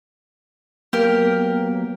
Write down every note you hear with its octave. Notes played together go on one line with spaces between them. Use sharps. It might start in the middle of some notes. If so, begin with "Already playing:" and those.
F#3 A#3 B3 G4 A#4